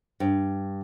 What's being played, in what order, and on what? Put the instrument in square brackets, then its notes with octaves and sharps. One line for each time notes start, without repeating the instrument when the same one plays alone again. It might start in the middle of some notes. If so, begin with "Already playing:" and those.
[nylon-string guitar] G2